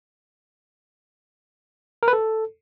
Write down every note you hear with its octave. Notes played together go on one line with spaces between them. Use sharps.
A#4
B4
A4